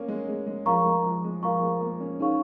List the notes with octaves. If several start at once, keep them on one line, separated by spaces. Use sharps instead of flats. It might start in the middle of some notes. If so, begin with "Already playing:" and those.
Already playing: A#3 C#4
G#3
G#3
G#3
F3 A#4 F5 A#5 C#6
G#3
F3
G#3
F3 A#4 F5 A#5 C#6
G#3
A#3
C#4
C#4 D#4 G#4 F5 C#6